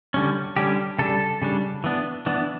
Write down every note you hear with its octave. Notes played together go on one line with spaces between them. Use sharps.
D3 G3 C#4
D3 G3 C#4 G4
C#3 G3 D4 A4
C#3 G3 D4
E3 B3 D4
E3 B3 D4